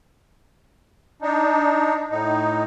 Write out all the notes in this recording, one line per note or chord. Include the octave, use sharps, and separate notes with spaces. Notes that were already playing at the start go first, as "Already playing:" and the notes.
D4 D#4
A2 D#4